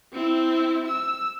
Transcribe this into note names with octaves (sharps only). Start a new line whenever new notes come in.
C4 E4
E6